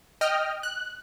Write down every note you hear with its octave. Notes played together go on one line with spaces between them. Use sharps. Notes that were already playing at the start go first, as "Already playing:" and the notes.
D#5 G5 F6
F#6